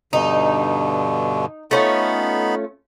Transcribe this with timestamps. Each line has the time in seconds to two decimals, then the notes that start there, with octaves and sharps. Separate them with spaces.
0.13 G2 B2 D3 D#4
1.71 A3 B3 C#4 D#4 F4 B5